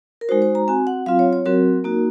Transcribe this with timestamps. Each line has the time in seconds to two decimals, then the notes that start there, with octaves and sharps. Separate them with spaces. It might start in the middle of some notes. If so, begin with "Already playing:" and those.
0.21 A#4
0.29 G#3 D#4 F#4 C5
0.42 C5
0.55 A#5
0.68 C4 F#4 G#5
0.87 F#5
1.06 F#3 C4 F4 F5
1.19 C#5
1.33 C#5
1.46 F#3 C4 F#4 A#4
1.84 A#3 D#4 F#4